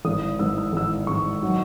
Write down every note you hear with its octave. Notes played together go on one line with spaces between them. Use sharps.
G#1 G#2 E3 D#6
G#1 G#2 E3 E6
E6
G#1 G#2 E3 E6
G#1 G#2 E3 C#6
D#3 F#3